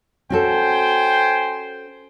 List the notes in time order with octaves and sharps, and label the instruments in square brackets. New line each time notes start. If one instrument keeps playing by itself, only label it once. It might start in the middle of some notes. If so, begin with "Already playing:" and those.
[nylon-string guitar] C#4 F#4 A4 [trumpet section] C5 G5 G#5